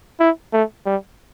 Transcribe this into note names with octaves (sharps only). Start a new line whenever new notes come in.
E4
A3
G3